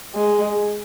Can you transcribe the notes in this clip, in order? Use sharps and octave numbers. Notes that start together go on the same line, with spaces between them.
G#3